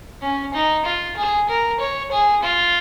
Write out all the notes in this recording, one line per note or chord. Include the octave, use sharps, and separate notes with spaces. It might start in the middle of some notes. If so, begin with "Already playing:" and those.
C#4
D#4
F4
G#4
A#4
C#5
G#4
F4